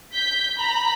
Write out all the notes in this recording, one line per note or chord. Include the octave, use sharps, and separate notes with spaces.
G6 B6
A#5 B5